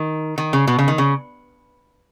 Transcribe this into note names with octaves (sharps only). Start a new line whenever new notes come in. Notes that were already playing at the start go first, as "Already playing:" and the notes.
Already playing: D#3
D#3
C#3
B2
C#3
D#3
C#3